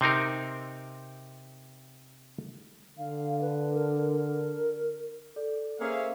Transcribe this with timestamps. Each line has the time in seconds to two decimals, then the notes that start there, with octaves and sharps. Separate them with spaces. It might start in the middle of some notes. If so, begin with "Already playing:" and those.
0.01 C3 C4 D#4 A#4
2.98 D3 F5
3.41 B4
3.74 A#4
4.13 A#4
5.36 A4 D5
5.80 A#3 C#4 G#4 C5 E5 F5